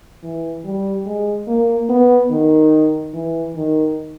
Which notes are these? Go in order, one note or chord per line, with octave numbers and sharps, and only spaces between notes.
E3
G3
G#3
A#3
B3
D#3
E3
D#3